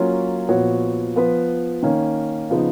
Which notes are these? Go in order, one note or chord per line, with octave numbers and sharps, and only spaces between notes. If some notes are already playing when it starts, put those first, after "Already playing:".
Already playing: F#3 A#3 C#4 F4
A#2 F3 B3 F#4 C#5
F3 B3 F4 B4
D#3 A#3 C#4
C#3 F3 B3 D#4